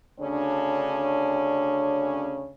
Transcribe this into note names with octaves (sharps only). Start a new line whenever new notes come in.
D2 C#3 C#4 D4